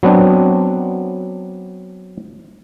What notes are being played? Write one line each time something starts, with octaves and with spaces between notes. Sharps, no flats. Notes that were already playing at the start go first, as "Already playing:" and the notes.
F#3 B3 C4 D4